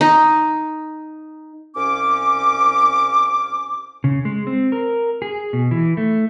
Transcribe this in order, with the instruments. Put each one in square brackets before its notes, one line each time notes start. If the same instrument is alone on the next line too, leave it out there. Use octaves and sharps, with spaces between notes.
[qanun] D#4
[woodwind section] C2 C#4 D6
[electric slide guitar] C#3
G#3
C4
A#4
G#4
B2
E3
A3